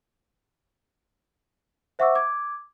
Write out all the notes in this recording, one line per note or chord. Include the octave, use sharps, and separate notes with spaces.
C5 E5 F#5 C#6 D6 E6
D6 G#6